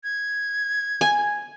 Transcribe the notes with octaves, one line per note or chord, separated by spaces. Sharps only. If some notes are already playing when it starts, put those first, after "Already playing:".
G#6
G#5